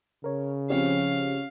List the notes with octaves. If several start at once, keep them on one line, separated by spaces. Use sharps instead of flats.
C#3 A#4 C#5
F3 C4 C#4 G4 F5